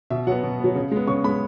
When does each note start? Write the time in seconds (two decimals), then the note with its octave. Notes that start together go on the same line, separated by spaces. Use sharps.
0.10 B2 E5
0.27 F#3 B3 F#5
0.43 B2
0.60 F#3 B3
0.75 C#3
0.91 G#3 B3
1.07 C#3 C#6
1.24 G#3 B3 B5